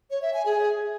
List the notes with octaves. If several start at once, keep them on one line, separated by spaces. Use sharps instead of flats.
C#5
E5
G#5
G#4